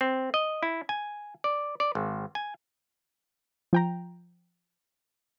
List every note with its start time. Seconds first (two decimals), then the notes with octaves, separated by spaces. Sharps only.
0.01 C4
0.34 D#5
0.63 E4
0.89 G#5
1.44 D5
1.80 D5
1.95 G#1
2.35 G#5
3.73 F3 G5 A#5